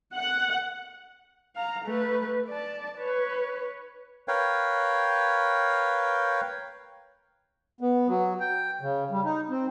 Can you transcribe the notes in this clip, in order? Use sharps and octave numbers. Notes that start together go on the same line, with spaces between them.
F#5
F5 A#5
A3 B4
D5 A5
B4 C#5
A#4 B4 C#5 F5 G5
B3
F#3
G5
C#3
G3
D#4
C4